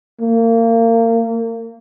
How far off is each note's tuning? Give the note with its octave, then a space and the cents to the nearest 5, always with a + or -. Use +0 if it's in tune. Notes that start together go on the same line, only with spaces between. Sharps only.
A#3 -30